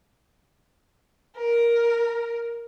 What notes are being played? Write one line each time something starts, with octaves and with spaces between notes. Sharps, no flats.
A#4